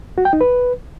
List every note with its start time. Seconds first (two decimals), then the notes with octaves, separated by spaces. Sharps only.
0.18 F#4
0.25 G5
0.33 D#4
0.41 B4